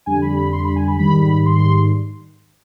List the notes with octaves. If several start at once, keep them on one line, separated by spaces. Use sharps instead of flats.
F2 D3 G3 G#5
B5
B5
C6
B5
G#5
B5
G#2 D#3 G3 B5
B5
C6